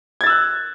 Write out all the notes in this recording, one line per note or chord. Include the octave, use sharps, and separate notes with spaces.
E6 F#6 G#6 A6